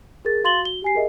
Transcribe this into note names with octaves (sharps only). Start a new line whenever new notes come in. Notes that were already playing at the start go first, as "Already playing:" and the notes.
G#4 A#4 A6
F#4 F5 C6 A6 F#7 G7
F#4 G7
G4 G#5 C7
G#4 A#4 D#5 E5